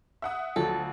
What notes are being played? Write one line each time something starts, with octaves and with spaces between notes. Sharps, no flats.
E5 F#5 D#6
D2 F3 F#3 A4